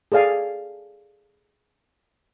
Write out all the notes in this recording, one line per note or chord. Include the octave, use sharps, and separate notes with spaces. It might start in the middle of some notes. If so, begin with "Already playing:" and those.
G#4 A4 D5 F5 G#5